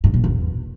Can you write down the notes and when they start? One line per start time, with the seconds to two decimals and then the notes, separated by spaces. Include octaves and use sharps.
0.04 G#2
0.14 A#2
0.24 E2